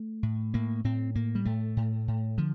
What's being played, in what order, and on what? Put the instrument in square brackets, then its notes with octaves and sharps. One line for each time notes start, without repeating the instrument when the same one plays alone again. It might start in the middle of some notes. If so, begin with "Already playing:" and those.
Already playing: [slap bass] A3
A2
A2 A#3
A2 C4
A2 A#3
G3
A2 A3
A2
A2
D3 F3